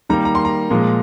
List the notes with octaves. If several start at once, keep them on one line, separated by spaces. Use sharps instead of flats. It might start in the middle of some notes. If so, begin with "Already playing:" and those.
D#3 G3 A#3 A#5
A#5
C6
A#5
A#2 F3 G#3